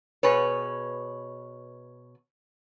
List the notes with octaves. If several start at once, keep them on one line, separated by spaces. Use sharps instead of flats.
B2 G#4 B4 C#5